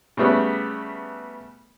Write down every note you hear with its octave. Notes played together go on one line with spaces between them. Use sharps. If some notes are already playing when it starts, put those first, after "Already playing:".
C#3 G3 A3 B3